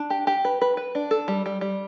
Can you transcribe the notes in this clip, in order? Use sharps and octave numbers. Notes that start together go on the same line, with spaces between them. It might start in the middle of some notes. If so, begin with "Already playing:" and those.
Already playing: D4
G4
G4
B4
B4
B4
D4
A4
G3
G3
G3